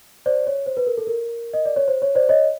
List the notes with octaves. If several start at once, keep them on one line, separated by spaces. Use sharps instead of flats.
C5 D5
C#5
C5
B4
A#4
A4
A#4
D#5
D5
C#5
C5
C#5
C5 D5
C#5 D#5